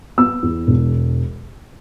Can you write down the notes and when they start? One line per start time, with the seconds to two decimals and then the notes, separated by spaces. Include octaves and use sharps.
0.18 B3 E6
0.43 E2
0.67 E1